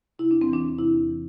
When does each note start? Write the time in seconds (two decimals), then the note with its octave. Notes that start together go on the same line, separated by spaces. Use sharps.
0.19 C3 E4
0.31 E2 D4
0.41 C4
0.49 E3 D4
0.64 E2
0.78 C3 E4
0.94 E2
1.08 E3